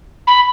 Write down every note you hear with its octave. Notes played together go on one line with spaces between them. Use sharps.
B5